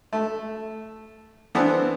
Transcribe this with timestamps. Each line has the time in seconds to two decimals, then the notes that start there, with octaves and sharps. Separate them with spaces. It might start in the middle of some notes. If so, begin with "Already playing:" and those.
0.13 A3
1.55 E3 B3 C4 D4